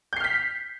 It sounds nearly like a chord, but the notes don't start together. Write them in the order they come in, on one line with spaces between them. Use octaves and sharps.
G6 C7 F6 B6